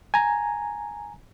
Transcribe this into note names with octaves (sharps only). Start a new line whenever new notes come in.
G#5 A#5